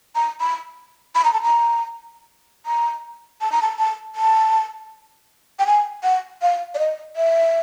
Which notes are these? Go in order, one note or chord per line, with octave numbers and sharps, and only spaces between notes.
A#5
B5
B5
A#5
A5
A#5
A#5
A5
A#5
A5
A5
A5
G5
G#5
F#5
F5
D5
D#5
E5